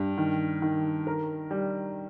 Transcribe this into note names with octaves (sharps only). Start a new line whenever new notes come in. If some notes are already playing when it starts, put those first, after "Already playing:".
Already playing: G2
D#3
D#3
A#4
G3